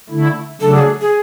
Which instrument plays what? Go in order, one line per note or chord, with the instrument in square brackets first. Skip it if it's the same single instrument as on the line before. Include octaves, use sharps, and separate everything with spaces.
[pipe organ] D3 A3 E4
[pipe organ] C#3 F#3 A3 D4 [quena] A4
[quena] G#4
G#4